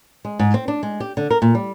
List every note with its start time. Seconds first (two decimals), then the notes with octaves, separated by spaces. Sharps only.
0.25 G#3
0.39 G#2
0.54 C4
0.68 D4
0.83 G#3
1.00 G4
1.17 D3
1.30 A#4
1.42 A#2
1.55 G3